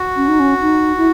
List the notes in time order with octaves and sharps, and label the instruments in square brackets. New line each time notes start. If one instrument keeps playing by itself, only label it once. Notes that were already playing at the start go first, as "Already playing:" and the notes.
Already playing: [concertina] F#4
[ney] C#4
D#4
C#4
D#4
E4